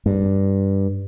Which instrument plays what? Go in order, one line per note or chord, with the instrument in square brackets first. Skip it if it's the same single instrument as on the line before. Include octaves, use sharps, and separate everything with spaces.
[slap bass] G2